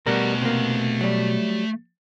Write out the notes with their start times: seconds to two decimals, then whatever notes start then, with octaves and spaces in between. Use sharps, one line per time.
0.06 B2 G3 A3 A#4 F#5
0.42 C3 A#3
1.01 F#3 G3